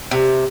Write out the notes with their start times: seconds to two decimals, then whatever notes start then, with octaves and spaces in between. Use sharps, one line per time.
0.11 C3